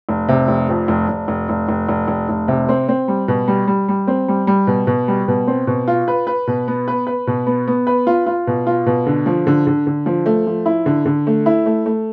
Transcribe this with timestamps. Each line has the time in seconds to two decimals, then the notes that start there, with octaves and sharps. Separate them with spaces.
0.09 F1
0.28 C3
0.48 F1
0.69 F2
0.88 F1
1.09 F1
1.28 F1
1.49 F1
1.68 F1
1.89 F1
2.08 F1
2.29 F1
2.48 C3
2.69 C4
2.88 C4
3.08 G3
3.28 B2
3.48 G3
3.68 G3
3.88 G3
4.08 C4
4.28 G3
4.47 G3
4.67 B2
4.87 B2
5.08 G3
5.28 B2
5.47 C4
5.67 B2
5.88 F4
6.08 B4
6.27 B4
6.47 B2
6.68 B3
6.88 B4
7.07 B4
7.27 B2
7.47 B3
7.68 B3
7.87 B4
8.07 F4
8.26 F4
8.47 B2
8.67 F4
8.86 B2
9.07 D3
9.26 F3
9.47 D3
9.67 D3
9.87 D3
10.06 F3
10.26 A3
10.47 F3
10.66 E4
10.86 D3
11.06 D3
11.27 A3
11.46 E4
11.66 A3
11.86 A3